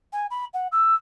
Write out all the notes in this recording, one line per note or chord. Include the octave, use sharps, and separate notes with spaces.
G#5
B5
F#5
E6